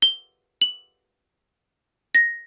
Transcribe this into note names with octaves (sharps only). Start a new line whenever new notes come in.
G7
F#7
A#6